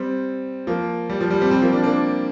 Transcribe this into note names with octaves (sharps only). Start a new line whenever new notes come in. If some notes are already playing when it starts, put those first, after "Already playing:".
Already playing: G3 C4
F3 A#3
G3
F3
G3
G3 C4
G3 C4
F3 A#3
A#3 D4
A#3 D4